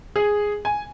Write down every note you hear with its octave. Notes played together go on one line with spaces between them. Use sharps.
G#4
G#5